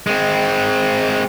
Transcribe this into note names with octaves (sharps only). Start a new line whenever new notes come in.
G#3 C4